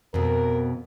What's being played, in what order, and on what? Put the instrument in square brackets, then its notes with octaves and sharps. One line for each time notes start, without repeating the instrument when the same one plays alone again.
[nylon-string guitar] F2 B2 [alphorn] A#4